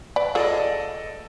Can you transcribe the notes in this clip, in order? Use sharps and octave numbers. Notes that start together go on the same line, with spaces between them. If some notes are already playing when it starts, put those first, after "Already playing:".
B4 D5
F4 G#4 A4 D5 D#5